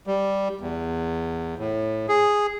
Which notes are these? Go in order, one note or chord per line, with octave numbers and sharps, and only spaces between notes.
G3
E2
A2
G#4